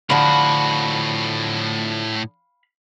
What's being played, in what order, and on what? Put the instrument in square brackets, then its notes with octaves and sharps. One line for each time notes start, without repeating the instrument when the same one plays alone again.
[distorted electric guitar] A2 F#4 [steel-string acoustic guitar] D3 F3 [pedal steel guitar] F5 B5